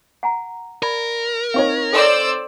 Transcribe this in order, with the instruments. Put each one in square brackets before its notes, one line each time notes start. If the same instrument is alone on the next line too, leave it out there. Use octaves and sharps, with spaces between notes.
[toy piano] F#5 G#5 A#5
[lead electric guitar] A#4 [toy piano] D5 B5
[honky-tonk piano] C4 D#4 C#5 [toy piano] F5 C#6
[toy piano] A4 G5 [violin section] C5 D5 E6